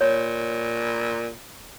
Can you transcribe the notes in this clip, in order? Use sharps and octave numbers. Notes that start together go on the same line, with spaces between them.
A#2 C#5